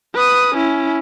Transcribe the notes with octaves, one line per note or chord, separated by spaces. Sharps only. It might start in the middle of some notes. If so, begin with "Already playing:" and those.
B4 D#6
C#4 E4